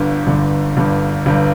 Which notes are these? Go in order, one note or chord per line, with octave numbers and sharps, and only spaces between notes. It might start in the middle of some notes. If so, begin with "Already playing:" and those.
Already playing: G1 G2 D3
G1 G2 D3
G1 G2 D3
G1 G2 D3